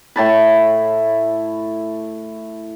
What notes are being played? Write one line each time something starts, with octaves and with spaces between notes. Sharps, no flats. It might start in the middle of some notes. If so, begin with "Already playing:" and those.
A2 A5 B5